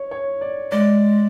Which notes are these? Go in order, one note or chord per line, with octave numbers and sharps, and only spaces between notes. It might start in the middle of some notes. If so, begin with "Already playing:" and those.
Already playing: C#5
C#5
D5
G#3 D5